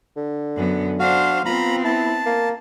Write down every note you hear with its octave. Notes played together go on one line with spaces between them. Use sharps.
D3
F#2 B3
D4 F#4 C5 F5
B3 C4 F4 A#5 B5
E4 A5
A#3